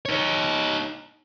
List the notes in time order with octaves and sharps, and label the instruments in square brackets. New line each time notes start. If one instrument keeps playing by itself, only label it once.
[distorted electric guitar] D#4 C#5